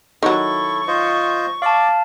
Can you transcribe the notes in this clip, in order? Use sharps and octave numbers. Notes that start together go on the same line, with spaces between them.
D#3 F#3 E4 A4 C#6
F4 C5 D#5
D5 F5 A5 D6